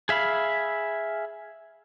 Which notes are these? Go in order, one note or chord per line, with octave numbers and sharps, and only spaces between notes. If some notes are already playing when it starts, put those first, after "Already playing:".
G#4 E5 F5 B5